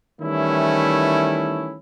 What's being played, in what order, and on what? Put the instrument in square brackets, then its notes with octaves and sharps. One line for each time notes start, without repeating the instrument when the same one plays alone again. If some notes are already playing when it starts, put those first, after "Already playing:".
[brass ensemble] D#3 E3 G3 A3 C#4 E4